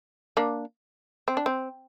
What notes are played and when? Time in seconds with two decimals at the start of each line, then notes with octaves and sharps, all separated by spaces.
0.37 A#3 D4
1.28 C4
1.37 D4
1.46 C4